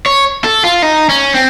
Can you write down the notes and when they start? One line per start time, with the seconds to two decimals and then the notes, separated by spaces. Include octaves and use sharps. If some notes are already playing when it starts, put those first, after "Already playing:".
0.06 C#5
0.44 A4
0.64 F4
0.82 D#4
1.09 C#4
1.34 C4